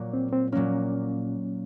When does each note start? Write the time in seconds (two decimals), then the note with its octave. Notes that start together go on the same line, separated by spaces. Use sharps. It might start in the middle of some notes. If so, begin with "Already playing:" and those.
Already playing: A#2 F#3 A#3
0.13 C4
0.33 C4
0.52 A#2 F#3 A#3 C#4